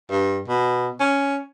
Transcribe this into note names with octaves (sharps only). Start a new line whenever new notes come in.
G2
B2
C#4